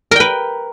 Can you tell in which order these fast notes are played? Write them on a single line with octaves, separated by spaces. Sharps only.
A#4 G5 B4